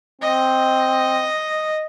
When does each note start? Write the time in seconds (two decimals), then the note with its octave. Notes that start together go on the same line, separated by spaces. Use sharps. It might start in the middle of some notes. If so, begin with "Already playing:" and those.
0.22 C4 D#5